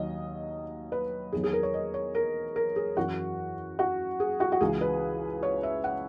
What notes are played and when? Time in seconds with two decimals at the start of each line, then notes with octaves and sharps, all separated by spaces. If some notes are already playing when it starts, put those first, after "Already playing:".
Already playing: D#2 D#3 F#3 D#5
0.92 B4
1.33 E2 D#3 F#3 G#4
1.44 G#4
1.53 A#4
1.63 C#5
1.74 D#5
1.94 C#5
2.15 A#4
2.56 A#4
2.76 G#4
2.97 F#2 E3 F#4
3.79 F#4
4.20 G#4
4.40 F#4
4.52 F#4
4.61 C#2 C#3 E3 G#4
4.81 B4
5.43 C#5
5.63 E5
5.84 F#5